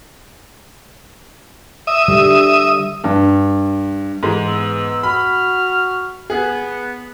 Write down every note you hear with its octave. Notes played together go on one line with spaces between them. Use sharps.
E5 D#6
D3 G3
G2
G#2 E3 G#3
B3 E6
F#4 B5 F6
B3 G#4